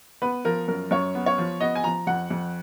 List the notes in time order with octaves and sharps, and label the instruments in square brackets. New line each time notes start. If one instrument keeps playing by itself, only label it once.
[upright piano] B3 B4
F3 A#4
F#2 A#4
F#2 C#5
B3
C#5
F3
B3 D#5
G#5
F3 A#5
F2 F#5
F2